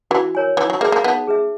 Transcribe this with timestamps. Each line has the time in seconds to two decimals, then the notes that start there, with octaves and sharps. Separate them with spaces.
0.11 E3 F#4
0.35 A#4 C#5 G#5
0.57 E3 D#4
0.70 F#3
0.81 A#3 G#4 B4 E5
0.92 A#3
1.04 B3 D#4
1.27 G#4 B4 E5